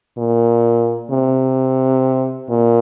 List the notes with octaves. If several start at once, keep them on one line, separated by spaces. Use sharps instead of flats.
A#2
C3
A#2